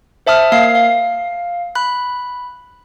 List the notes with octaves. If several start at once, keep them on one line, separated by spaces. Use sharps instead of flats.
C5 E5 A5 D#6 F6
A#3 F5 F6 C7
F5
B5 F#6